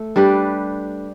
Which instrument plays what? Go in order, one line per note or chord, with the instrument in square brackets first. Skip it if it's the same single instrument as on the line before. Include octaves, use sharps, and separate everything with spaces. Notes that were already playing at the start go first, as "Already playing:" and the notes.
Already playing: [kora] A3
G3 D4 G4 B4